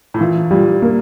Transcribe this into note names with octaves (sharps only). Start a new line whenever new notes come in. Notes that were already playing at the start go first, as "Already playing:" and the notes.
A2
A#2 E3
A#2 G3
A#3